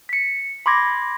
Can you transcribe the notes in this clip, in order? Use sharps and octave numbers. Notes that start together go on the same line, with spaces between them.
B6 C#7
B5 C6 D6 G#6 A#6